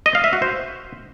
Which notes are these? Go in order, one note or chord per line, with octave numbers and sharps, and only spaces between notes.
D#5
F5
E5
F#4
C5